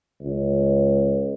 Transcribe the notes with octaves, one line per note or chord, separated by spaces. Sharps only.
C#2